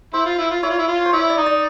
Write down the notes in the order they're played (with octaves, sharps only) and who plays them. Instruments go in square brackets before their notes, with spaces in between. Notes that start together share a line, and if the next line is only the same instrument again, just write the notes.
[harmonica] E4 [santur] C5
[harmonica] F4
E4
F4
[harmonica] E4 [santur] C#5
[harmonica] F4
E4
F4
[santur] C5
[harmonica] E4 [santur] C#5
[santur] D5
[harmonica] D#4
[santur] D5